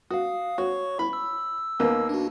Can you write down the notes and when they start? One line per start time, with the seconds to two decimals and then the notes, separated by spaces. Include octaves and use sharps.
0.11 F#4 F5 D#6
0.58 F#4 C#5 C#6
0.99 E4 B5
1.13 E6
1.80 D#2 A#3 B3
2.09 D4 F#4